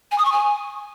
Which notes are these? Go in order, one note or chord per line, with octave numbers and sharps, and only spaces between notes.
G#5
D#6
C#6
G#5